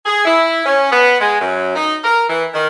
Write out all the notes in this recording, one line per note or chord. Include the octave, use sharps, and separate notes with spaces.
G#4
E4
C#4
B3
G#3
F#2
D#4
A#4
E3
D#3